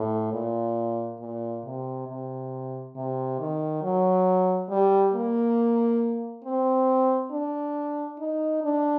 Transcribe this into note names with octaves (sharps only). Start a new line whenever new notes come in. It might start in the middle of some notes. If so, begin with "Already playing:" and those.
Already playing: A2
A#2
A#2
C3
C3
C3
D#3
F#3
G3
A#3
C4
D4
D#4
D4